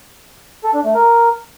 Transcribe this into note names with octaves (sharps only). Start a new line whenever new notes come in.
A4
D4
A3
A#4